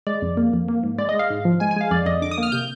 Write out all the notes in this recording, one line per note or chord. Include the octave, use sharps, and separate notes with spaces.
G#3 D5
F2
A#3
F2
A#3
G#2
G#3 D5
D#5
G#3
F5
G#2
F3
G#3 G#5
G#5
G#3 F5
F2 D5
F2 D#5
D3 D6
D#6
A#3 F6
C3 G6